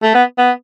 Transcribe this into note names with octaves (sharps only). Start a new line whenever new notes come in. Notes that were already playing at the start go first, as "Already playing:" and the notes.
A3
B3
B3